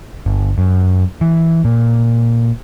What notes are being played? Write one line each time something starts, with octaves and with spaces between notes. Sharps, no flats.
G1
F#2
E3
A#2